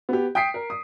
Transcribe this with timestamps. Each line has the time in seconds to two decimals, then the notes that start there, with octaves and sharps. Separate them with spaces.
0.09 B3 G4
0.35 G5 D#6 B6 C7 D7
0.54 A#4
0.70 D#6